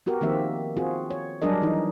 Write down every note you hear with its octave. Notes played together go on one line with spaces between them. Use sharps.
B3 F#4 G4 A#4
D#3 F3 A#3 C4 G4 E5
C4 F4 F#4 G#4
C#5
F#3 G3 D4 G#4 A#4 D#5
E3 D#4